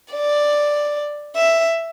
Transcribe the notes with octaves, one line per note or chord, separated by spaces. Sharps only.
D5
E5